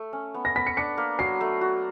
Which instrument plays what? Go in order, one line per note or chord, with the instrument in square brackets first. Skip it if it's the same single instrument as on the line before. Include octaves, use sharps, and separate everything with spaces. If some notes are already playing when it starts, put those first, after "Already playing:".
Already playing: [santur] A3
C#4
B3
[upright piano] A#6
[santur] B3 [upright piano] B6
[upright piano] C#7
[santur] D4 [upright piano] C#7
[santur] A#3
[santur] F#3 [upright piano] C7
[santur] A3
F#4